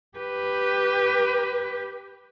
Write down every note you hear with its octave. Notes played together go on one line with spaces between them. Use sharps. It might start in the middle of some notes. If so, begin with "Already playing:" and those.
G4 B4